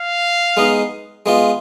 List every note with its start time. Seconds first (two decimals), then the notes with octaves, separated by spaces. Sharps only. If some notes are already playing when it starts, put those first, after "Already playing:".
Already playing: F5
0.57 G#3 B3 D#4
1.26 G#3 B3 F4